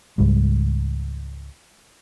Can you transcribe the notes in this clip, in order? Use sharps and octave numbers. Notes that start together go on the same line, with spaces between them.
C#2 G#2 G3 G#3